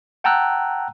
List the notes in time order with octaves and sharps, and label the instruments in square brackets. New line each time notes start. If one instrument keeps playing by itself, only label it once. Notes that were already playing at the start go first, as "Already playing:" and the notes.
[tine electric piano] F#5 G5 A5 A#5 E6 F#6